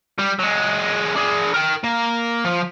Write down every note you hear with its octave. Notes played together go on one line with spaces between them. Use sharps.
G3
F#3 G#3
D4 G#4
A#4 G5
A#3
F3